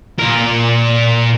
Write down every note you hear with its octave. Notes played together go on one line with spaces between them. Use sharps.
A#2 A#4